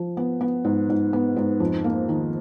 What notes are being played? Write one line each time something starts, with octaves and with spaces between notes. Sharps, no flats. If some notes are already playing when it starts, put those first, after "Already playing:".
Already playing: F3
B3
B3
G#2
G#2
B3
G#2
F2
A#3
D#3